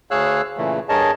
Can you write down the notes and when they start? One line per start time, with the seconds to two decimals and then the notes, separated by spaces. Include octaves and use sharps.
0.11 D2 G#4 C#5 F5 E6 F#6
0.57 A#2 C#3 E3 A3
0.89 G2 G#4 A#4 C#5 D#5 A5